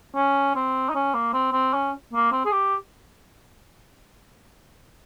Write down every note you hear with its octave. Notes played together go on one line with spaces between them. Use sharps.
C#4
C4
D#4
C#4
A#3
C4
C4
C#4
A#3
C4
G#4
G4